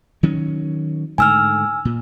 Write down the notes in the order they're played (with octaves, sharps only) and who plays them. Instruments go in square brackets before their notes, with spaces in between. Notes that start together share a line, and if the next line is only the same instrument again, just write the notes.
[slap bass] D#3 F#3 C#4
[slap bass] G#2 D3 A3 [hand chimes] G#5 E6 F6
[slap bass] A#2